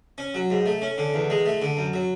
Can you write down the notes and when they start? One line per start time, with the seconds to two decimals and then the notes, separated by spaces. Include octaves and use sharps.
0.18 C#4
0.34 F#3
0.51 G#2
0.66 A3
0.82 C#4
0.98 D3
1.14 E2
1.30 G#3
1.46 A3
1.62 D3
1.77 F#2
1.93 F#3